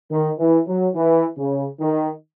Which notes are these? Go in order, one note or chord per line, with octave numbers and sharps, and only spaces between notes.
D#3
E3
F#3
E3
C#3
D#3